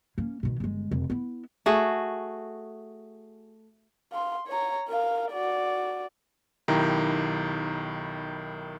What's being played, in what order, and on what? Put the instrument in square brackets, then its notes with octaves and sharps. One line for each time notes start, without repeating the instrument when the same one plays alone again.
[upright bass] A#3 C#4
B2 D#3
G1 G#3
F1
B3 E4
[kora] A3 F#4 G#4
[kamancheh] F5 C6
C#5 A#5
A#4 F5
F#4 D5
[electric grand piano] B1 D#3 E4 G4 G5 A#5